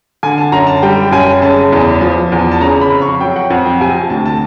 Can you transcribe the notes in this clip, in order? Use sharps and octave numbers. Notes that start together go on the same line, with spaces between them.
D3 G#5
A5
F#2 A#5
A5
G3 G5
F#2 G#5
C#3 A5
E2
F3
E2
A5
C#3 A#5
B5
F2
C#6
F#3 G5
F#5
F2 F#5
G5
C3 G#5
A5
D2 A5
A5